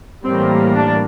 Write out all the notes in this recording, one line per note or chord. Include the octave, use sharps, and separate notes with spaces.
A2 E3 G3 A#3 C4
D4